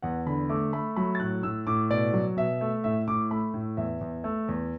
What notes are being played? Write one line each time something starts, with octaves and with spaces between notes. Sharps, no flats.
E2 F#5
D3 B5
A3 D6
A3 B5
F#3 B5
A6
A2 F#6
A2 E6
A2 D6
B2 D5
F#3
B2 E5
A3
A2 E5
A2 D6
A3 B5
A2
E2 E5
E2
A3
E2